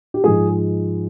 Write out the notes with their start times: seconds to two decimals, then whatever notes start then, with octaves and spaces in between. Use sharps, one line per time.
0.14 G4
0.24 G#2 F3 G#3 G#4